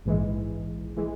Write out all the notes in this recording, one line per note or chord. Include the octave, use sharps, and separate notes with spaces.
A#1 G#2 E3 G#3
E3 G#3